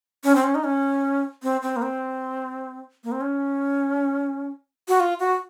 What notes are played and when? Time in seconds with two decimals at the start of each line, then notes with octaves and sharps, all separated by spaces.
0.24 C#4
0.35 C4
0.44 C#4
0.55 D#4
0.64 C#4
1.43 C4
1.62 C4
1.76 A#3
1.82 C4
3.04 A#3
3.12 C4
3.21 C#4
4.88 F#4
5.00 F4
5.19 F#4